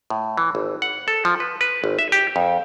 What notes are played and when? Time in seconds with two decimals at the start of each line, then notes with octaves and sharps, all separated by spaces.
0.10 A2
0.37 E3
0.55 G#1
0.82 F#5
1.08 A4
1.25 F3
1.40 B4
1.61 B4
1.84 G#1
1.99 E5
2.12 G4
2.36 F2